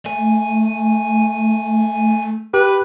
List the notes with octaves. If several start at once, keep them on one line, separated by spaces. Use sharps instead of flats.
A3 G#5
G4 B4